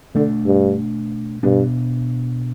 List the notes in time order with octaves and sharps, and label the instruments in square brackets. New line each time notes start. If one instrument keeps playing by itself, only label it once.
[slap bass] B2 A3 D4 [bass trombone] D3
[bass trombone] G2
[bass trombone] G2 [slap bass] B2 B3 D4